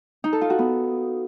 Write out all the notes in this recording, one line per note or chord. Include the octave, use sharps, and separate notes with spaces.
D#4
A4
F4
F#4
B3